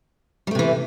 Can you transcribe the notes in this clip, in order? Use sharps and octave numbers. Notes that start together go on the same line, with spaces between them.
C3 E3 G3 A3